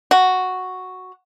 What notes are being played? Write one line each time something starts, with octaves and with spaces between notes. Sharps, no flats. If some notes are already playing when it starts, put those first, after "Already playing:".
F#4